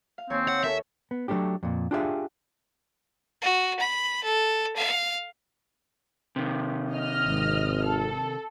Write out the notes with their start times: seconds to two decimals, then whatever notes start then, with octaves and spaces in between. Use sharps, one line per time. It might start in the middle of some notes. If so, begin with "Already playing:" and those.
0.18 F5
0.30 D#2 C4 C#5 G#5
0.48 F#5
0.64 A4 A#4 C#5 E5
1.11 B3
1.28 F#3 G#3 A3 D4 G4
1.63 F2 A#2
1.91 D4 F4 G4 G#4 B4 E5
3.42 F#4
3.80 B5
4.24 A4
4.76 F5
6.36 C3 D#3
6.93 D#5 F6
7.27 G#1
7.86 A4